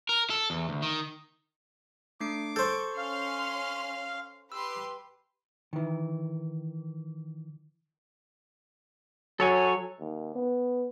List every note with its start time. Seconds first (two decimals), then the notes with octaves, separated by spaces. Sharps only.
0.09 A#4
0.30 A4
0.50 E2
0.69 D2
0.82 D#3
2.20 A3 D4 D6 C7
2.56 A4 C5 C#6 G6
2.98 C#4 F5 C6 F6
4.52 G4 B4 C6 E6
5.73 D#3 E3
9.40 F#3 A4 C#5 G#5
10.00 D#2
10.35 B3